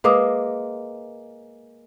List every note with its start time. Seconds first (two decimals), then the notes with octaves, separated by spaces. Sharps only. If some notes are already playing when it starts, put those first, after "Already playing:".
0.04 G#3 A#3 B4 D6 D#6